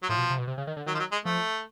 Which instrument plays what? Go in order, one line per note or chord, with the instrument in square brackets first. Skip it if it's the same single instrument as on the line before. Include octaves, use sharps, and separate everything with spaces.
[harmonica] F#3
[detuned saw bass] A2 [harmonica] F3
[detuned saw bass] B2
C3
B2
C3
C#3
D#3
D3
[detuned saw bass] D#3 [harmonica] F#3
[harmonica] F3
F#3
G#3
[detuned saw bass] F3 [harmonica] A3